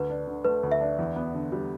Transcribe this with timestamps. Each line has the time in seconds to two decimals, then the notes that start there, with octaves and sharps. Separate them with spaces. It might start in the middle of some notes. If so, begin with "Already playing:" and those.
Already playing: D2 B4
0.10 D4
0.27 D3
0.45 A3 B4
0.63 D2
0.72 E5
0.81 D4
0.99 E2
1.16 B3
1.34 D3
1.52 G3